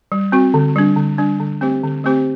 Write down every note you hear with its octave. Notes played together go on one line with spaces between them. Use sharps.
G3
C4 F#4
D3
G3 D4
D3
G3 D4
D3
A3 C4 G4 C5
D3
A3 C4 G4 C5